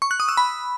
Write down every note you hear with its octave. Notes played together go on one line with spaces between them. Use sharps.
C#6
F#6
D#6
E6
B5